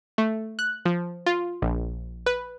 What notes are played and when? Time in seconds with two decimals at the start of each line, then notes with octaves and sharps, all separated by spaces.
0.18 A3
0.59 F#6
0.85 F3
1.26 F4
1.62 A#1
2.26 B4